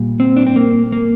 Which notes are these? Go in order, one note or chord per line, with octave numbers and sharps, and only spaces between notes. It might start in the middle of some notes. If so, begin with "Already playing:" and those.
Already playing: A#2 G3
C4
D4
C4
A#3
A#3